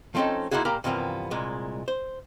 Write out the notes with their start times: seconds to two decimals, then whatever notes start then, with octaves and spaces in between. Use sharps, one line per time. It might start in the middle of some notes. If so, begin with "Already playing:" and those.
0.15 F3 A3 C4 C#4 D#4 A4
0.51 G#3 A#3 D#4 E4 F#4 G#4
0.65 A#2 A#3 G4 A#4 A#5 B5
0.84 G2 C3 E3 F3 A#3 B3
1.31 C2 A#2 G#3
1.88 C5